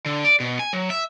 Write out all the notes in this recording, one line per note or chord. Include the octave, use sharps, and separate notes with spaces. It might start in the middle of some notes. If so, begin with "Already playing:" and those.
D3
D5
B2
G#5
F#3
E5